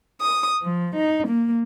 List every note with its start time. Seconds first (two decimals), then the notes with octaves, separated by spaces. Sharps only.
0.21 D#6
0.62 F3
0.95 D#4
1.27 A#3